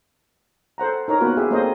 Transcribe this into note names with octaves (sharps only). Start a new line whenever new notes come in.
A4 C5 F#5 A#5
D#4 A#4 C#5 A#5
A#3 B3 F4 F#4 B4
G4 G#4 E5
A#3 C4 A4 C5 C#5 D#5